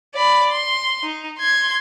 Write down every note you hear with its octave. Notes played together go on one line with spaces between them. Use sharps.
D5 B5
C6
D#4
C6 G#6